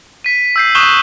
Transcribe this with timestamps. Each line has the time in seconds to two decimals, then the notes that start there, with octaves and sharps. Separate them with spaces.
0.24 B6 D#7
0.56 E6 G6 C7
0.75 C#6 D#6 F#6 G6 E7 G7